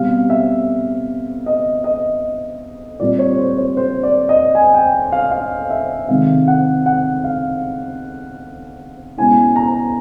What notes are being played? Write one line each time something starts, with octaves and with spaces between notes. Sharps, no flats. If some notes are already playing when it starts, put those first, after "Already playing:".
Already playing: B2 G3 C4 F5
E5
D#5
D#5
A#2 G3 C4 F4 D5
C#5
C5
C#5
C5
D5
D#5
G#5
G5
F5
F5
E5
C3 D#3 G#3 F5
F#5
F#5
F5
B2 G#3 C#4 E4 G#5
A#5